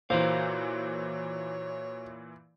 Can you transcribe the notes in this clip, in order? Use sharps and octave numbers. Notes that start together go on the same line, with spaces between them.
A#2 E3 F#4 A#4 C5 C#5 F5